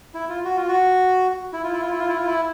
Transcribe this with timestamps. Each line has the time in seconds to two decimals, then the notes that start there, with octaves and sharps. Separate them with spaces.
0.14 E4
0.29 F4
0.45 F#4
0.56 F4
0.68 F#4
1.53 E4
1.63 F4
1.72 E4
1.81 F4
1.90 E4
1.99 F4
2.09 E4
2.17 F4
2.27 E4